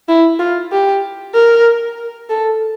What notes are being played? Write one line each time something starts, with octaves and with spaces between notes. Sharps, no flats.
E4
F4
G4
A#4
A4